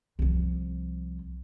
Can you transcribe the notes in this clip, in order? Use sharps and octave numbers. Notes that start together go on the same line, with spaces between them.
C2 F3